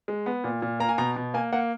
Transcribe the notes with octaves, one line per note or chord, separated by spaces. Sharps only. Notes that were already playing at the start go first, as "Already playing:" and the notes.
G#3
B3
A#2
A#2
A#3 A#5
G#5
B2 A#5
B2
A#3 G#5
A#3 F#5